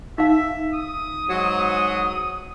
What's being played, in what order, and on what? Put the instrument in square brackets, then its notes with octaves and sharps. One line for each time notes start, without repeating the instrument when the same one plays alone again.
[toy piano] D#4 F5 [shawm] E5
[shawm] D#6
[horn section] G#2 F#3